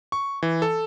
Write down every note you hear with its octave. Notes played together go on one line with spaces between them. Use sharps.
C#6
E3
A4